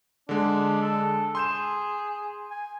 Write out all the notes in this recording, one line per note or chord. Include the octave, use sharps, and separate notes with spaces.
D3 G#3 D4
A4
G#4 C6 G6 E7
G#5